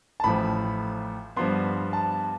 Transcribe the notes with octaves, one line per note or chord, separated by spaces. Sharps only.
A5
A1 A2 F3 B5
G2 F3 B3 C6
A5